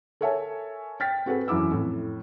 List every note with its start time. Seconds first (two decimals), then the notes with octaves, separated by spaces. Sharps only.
0.21 A4 A#4 C#5 E5 G#5 A5
1.00 G5 F6 A6 B6
1.26 C4 F#4 G#4 A4 B4
1.48 F#2 E3 E4 D6 E6
1.71 F2 A2